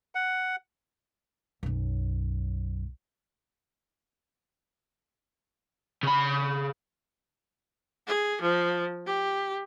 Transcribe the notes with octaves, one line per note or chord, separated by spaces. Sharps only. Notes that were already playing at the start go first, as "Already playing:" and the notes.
F#5
B1 F#2
C#3 B5
G#4
F3
G4